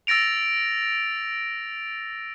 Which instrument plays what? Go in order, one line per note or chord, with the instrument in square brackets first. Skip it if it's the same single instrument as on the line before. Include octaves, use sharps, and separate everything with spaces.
[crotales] E6 A6 A#6 D7 F7